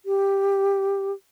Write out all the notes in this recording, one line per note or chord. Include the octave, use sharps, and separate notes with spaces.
G4